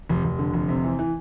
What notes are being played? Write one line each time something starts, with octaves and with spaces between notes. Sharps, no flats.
F1
F1
D3
F1
C3
E3
E3